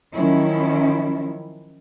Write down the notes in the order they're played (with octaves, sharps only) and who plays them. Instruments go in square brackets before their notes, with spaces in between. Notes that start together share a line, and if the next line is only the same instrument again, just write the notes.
[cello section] D#3 F3 F#3 C#4 E4